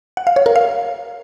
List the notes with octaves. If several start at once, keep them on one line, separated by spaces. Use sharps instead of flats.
F#5
F5
C#5
A#4
F5